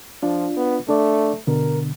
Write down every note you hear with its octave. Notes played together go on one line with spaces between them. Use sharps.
F3 D4 F4
B3
A3 D4 A4 D5
B2 D3 A#4